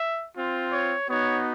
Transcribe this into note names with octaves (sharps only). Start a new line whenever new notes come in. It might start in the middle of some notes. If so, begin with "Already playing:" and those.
Already playing: E5
C4 F4
C#5
B3 D#4 F#4 C#5